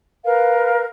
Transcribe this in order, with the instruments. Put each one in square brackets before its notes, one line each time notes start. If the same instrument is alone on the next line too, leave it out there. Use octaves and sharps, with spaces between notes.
[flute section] A#4 B4 F5